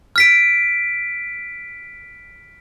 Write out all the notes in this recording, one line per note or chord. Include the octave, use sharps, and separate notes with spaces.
F6 B6 D7